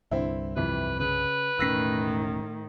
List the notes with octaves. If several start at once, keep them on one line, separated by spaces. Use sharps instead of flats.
C2 G2 D3 C4 E4
F2 C3 E3 B4
C#3 B4
E1 A2 D#3 C#4 E6 A#6 B6